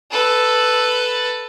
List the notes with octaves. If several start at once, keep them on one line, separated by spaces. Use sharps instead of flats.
A4 B4